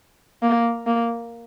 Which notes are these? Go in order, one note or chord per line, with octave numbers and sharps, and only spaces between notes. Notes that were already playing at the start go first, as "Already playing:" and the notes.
A#3
A#3